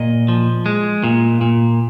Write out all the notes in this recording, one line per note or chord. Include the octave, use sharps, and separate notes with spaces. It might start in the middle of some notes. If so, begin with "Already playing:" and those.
Already playing: A#2 D#5
F3
G#3
A#2
A#2